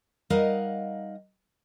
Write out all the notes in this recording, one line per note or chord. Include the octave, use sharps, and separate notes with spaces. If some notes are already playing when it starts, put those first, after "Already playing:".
G3 D#4 A#4 D#5 F5 F#5